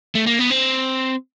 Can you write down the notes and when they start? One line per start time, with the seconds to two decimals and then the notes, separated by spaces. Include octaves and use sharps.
0.15 A3
0.27 A#3
0.39 B3
0.50 C4